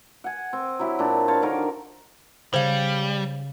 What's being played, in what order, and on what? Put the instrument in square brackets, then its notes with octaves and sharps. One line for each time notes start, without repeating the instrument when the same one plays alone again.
[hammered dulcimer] F#5 G#5
C4
F#3 E4 G4
A#2 D4
C5 C#5 F5 A5
D3 D#3 A#4
[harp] C#3 G#6 A#6 [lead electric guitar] G3 [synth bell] C5 F5